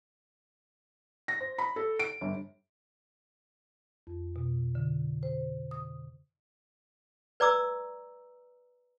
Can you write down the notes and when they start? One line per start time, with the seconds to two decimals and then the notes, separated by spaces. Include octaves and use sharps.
1.28 A#6
1.40 C5
1.58 B5
1.76 A4
1.99 D7
2.21 G1
4.07 F2
4.36 B2
4.75 D3
5.23 C5
5.71 D#6
7.40 B4 D5 A#5 D6 E6